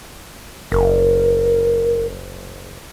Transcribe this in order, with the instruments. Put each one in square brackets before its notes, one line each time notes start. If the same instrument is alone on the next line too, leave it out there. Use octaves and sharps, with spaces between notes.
[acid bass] F#1 [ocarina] A#4